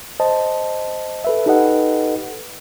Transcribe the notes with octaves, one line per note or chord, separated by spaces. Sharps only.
C5 D#5 A5
A4 B4 E5
D#4 G4 A4 B4 D#5 F#5